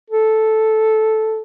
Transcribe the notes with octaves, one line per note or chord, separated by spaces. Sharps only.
A4